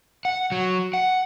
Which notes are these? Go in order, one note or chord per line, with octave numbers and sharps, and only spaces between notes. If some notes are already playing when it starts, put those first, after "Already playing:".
F#5
F#3
F#5